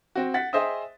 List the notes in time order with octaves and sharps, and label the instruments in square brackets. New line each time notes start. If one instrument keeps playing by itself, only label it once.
[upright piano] C4 F#4
F#5 A6 B6
G#4 C5 D#5 E5 G5 D#6